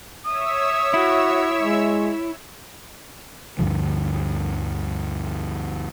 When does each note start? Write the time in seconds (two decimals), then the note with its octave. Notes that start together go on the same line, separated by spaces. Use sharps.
0.25 C#5 E5 D#6 E6
0.94 E4 F#4
1.61 G#3
3.59 D2 G2 D3 F3